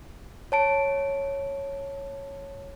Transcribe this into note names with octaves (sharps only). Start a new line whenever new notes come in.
C#5 A5 D7